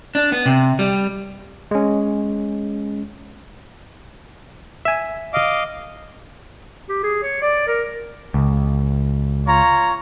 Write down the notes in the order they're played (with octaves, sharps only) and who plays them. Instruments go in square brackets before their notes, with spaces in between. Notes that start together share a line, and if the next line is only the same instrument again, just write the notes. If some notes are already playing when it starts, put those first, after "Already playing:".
[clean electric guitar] D4
B3
C3
G3
[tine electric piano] G#3 C#4
[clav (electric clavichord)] E5 G#5
[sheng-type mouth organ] D#5 F5 D6
[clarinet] G4
G#4
C#5
D5
A#4
[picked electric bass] C#2
[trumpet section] F4 C#5 A#5